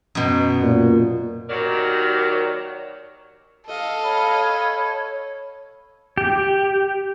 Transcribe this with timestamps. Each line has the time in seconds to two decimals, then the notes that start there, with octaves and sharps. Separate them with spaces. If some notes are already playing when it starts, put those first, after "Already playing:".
0.15 F#2 B2
0.62 A#2
1.49 D#2 D#3 F#3 A#4 D5
3.69 A4 D#5 F5
4.03 C#5 B5
6.18 G4